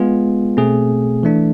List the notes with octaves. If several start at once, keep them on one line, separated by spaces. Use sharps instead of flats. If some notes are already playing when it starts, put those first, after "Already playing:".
Already playing: G#3 B3 F4 G#4
B2 A3 C4 G#4
E3 A3 D4